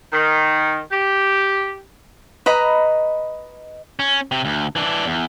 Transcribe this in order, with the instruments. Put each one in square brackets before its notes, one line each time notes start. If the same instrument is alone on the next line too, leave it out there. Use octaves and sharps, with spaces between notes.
[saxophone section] D#3
G4
[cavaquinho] B4 D#5 A#5 B5
[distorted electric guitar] C#4
C3
D2
E3 D4
E2